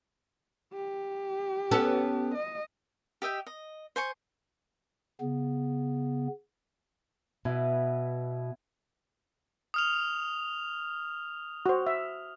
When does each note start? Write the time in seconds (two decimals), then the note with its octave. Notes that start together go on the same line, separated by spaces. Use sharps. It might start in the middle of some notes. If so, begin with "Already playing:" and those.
0.74 G4
1.71 B3 C#4 A4
2.35 D#5
3.22 G4 D#5 E5 G5
3.47 D#5
3.96 C5 G#5 C#6
5.21 C#3 B3
7.45 B2 E4 B4 F#5
9.74 D#6 F6 F7
11.66 F#4 C5
11.87 E5